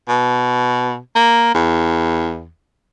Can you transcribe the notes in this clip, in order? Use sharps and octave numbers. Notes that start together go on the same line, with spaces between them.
B2
A#3
E2